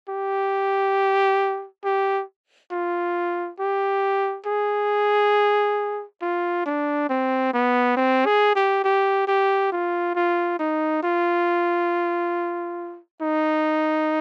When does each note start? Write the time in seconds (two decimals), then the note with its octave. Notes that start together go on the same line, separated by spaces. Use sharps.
0.09 G4
1.84 G4
2.72 F4
3.59 G4
4.46 G#4
6.22 F4
6.66 D4
7.09 C4
7.53 B3
7.97 C4
8.26 G#4
8.56 G4
8.84 G4
9.27 G4
9.72 F4
10.15 F4
10.60 D#4
11.03 F4
13.22 D#4